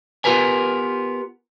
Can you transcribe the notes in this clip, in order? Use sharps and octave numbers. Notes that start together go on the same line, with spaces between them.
B3 F4 G4 A#4 B4 G#5